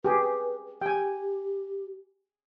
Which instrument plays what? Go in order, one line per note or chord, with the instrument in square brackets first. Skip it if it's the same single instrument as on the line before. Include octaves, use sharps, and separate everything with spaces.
[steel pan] G4 G#4 [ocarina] B4
[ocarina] G4 [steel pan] G5 G#5